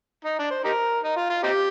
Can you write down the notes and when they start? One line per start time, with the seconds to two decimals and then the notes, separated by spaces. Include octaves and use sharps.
0.25 D#4
0.39 D4
0.51 C5
0.64 D#4 G4 A#4
1.03 D#4
1.17 F4
1.30 F4
1.43 C4 D#4 G4